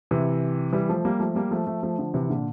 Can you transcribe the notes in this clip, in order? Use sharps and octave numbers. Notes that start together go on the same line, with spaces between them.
C3 E3
E3 G3
F3 A3
G3 A#3
F3 A3
G3 A#3
F3 A3
F3 A3
F3 A3
D3 F3
C3 E3
A#2 D3